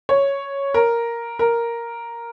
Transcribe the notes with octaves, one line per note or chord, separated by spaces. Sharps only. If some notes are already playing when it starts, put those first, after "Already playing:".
C#5
A#4
A#4